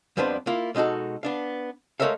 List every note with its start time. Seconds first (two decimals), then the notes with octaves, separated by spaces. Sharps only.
0.17 F2 G3 B3 D4 B4 C5
0.47 A#3 E4 F4
0.75 B2 G#3 D#4 F#4 A4
1.23 B3 D4 F5
2.00 G#3 A3 A#4 C#5 E5 F5